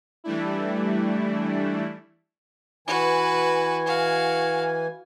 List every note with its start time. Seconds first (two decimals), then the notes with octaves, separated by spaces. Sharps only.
0.24 E3 G3 A3 D4 E4
2.88 E3 F#4 B4 G#5
3.86 F#4 F5